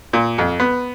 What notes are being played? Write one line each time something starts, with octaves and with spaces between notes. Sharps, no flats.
A#2
F2
B3